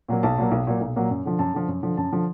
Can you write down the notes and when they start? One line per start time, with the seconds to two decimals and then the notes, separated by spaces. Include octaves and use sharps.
0.09 A#2 F#3 A#3
0.23 B1 A5
0.38 A#2 F#3 A#3
0.52 B1
0.67 A#2 F#3 A#3
0.81 B1
0.96 A#2 F#3 A#3
1.10 F#2
1.25 D3 F3
1.39 F#2 A5
1.54 D3 F3
1.68 F#2
1.83 D3 F3
1.97 F#2 A5
2.12 D3 F3